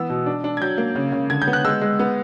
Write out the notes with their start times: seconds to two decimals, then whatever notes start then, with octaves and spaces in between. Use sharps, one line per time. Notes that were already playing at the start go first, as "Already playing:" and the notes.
Already playing: E3 B3 E6
0.10 B2
0.26 D4
0.44 D4
0.57 G#6
0.61 F#3 G6
0.78 A#3
0.95 C#3
1.12 C#3
1.30 D3 G#6
1.42 G6
1.47 B3
1.53 F#6
1.65 G#3 E6
1.81 G#3
1.99 B3